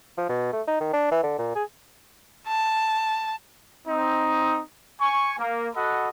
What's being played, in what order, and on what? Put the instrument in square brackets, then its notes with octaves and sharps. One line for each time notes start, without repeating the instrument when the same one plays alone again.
[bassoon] F3
B2
A3
D#4
D#3
D4
E3
D3
A#2
G#4
[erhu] A5
[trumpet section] C4 D#4
G#5 C#6
A#3
F#4 A4 D#5 F#5 B5